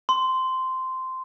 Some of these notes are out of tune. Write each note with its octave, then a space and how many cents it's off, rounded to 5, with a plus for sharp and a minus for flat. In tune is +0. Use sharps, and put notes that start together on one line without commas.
C6 -10